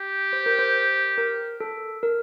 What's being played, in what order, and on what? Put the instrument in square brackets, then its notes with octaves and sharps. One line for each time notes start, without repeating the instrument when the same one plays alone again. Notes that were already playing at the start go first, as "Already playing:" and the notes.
Already playing: [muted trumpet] G4
[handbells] C5
A#4
C5
A#4
A4
A#4